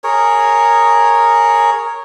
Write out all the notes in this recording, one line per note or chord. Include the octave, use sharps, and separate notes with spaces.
G#4 A#4 C#5